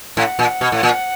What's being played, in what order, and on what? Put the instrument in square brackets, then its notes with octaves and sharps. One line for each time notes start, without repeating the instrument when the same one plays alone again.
[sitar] A2 [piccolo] F#5
[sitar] A#2
B2
A2
A#2